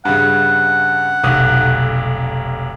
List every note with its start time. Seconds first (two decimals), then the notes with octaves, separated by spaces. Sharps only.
0.05 G2 C#3 F#5
1.23 F1 B1 D#6